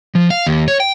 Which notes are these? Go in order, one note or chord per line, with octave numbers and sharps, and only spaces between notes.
F3
F5
D#2
C#5
G5